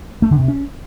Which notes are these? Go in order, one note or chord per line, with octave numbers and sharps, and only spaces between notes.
A3
D3
C3
C#4